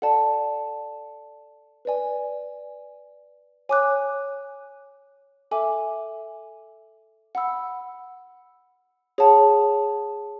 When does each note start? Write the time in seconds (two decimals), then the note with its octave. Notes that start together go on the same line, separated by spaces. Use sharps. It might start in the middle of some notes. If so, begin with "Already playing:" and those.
0.02 A4 D5 F#5 A5
1.85 B4 D5 G#5
3.69 C#5 G#5 D6 F#6
5.51 A4 E5 G#5 D6
7.35 F#5 B5 E6
9.18 G#4 C#5 F#5 A5